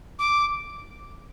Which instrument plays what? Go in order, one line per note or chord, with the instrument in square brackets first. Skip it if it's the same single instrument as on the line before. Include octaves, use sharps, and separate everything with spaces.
[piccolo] D6